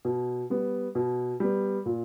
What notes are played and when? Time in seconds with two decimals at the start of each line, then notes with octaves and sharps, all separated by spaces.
0.05 B2
0.50 G3 B3
0.95 B2
1.40 G3 B3
1.86 A#2